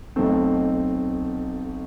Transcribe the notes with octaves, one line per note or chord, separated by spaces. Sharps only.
B1 B2 A3 C4